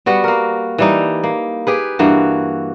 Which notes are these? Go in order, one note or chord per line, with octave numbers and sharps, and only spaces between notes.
G3 B3 F#4
A#3 A#4
E3 G3 D#4
A#3
G4 G#4 B4
G2 E3 A#3 F#4